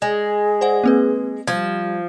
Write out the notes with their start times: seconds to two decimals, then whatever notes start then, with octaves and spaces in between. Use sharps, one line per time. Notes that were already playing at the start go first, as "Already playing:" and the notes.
0.02 G#3 G#4
0.61 C5 D5 F#5
0.84 A#3 C4 B4
1.47 F3 G3 G#6